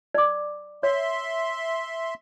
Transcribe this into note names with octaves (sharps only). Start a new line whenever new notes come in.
D5 D6
C#5 E5 C6